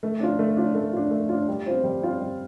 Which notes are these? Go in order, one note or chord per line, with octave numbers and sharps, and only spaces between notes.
A3
D4 F4
A3
D4 F4
A3
D4 F4
A3
D4 F4
G3
C4 F4 C5
G3
C4 F4 C5
G3